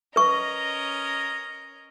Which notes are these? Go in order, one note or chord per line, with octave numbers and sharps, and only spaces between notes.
C#4 A#4 B4 D#5 C#6